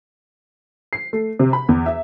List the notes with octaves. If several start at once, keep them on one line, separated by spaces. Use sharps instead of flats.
C7
A3
C3
B5
E2
E5